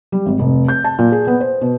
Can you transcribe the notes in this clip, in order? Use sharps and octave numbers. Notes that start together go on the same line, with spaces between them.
G3
G#1
F1
G6
A5
A#2
G#4
B3
C5
B2